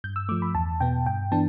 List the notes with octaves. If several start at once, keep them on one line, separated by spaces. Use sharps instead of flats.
G2 G6
E6
F3 A3 D6
B5
E2 A5
B2 B3 G5
G2 G5
E3 B3 D4 A5